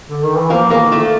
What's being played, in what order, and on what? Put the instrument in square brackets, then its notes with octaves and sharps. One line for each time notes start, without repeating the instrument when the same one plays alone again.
[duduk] D3
D#3
E3
[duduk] F3 [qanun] A#3 A#4
[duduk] E3 [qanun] A#3 A#4
[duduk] D#3
[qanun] A3 A4